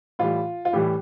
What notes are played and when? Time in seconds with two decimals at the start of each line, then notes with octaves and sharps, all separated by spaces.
0.19 A2 E3 G3 F4
0.65 F4
0.73 A2 E3 G3 G4